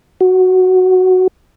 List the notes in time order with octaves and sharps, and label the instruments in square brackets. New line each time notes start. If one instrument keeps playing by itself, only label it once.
[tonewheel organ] F#4